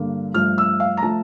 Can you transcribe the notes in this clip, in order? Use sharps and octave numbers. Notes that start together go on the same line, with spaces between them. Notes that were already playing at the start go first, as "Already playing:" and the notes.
Already playing: G2 D3 G3 A#3
G2 F3 A3 F6
E6
F5
A#5
F3 A3 A5